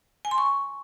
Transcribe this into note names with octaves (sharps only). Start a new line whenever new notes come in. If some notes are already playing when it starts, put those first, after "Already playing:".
G#5
C6
C#6